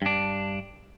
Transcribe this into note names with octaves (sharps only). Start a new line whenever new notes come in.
G2 D4